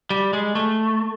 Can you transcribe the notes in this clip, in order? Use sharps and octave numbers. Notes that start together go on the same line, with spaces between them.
G3
G#3
A3